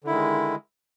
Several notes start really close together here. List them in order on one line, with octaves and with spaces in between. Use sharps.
D3 E4 D#3 G#3